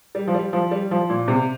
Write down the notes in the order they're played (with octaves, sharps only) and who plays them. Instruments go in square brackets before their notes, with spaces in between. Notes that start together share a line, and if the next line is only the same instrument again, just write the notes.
[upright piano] G3
F3
G3
F3
G3
F3
A#2
C3